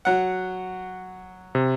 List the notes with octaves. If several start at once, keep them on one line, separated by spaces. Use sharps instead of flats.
F#3 F#5
C3